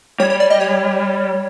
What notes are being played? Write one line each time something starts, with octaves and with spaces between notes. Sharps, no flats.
G3 C#5
C#5
D5
D#5
C#5